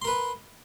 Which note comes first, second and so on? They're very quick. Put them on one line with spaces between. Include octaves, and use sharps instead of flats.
C6 A#4 B4